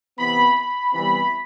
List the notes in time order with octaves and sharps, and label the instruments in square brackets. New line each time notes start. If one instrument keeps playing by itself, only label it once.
[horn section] C3 E3 B3 B5
B5
C3 E3 G3 B3 B5